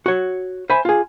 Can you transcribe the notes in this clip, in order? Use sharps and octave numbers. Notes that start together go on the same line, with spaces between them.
F#4 C#5
C5 E5 G#5 B5
F4 G#4